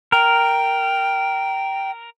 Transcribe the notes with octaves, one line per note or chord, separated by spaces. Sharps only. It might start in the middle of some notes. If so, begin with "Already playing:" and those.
A#4 G5